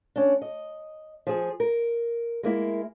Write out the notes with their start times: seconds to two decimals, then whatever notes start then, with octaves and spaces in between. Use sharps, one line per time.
0.16 C#4 D4
0.42 D#5
1.27 F3 G#4
1.60 A#4
2.43 G#3 A#3 E4